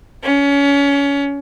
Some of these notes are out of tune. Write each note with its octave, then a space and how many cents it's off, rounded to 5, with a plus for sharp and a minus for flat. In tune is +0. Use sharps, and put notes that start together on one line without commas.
C#4 +25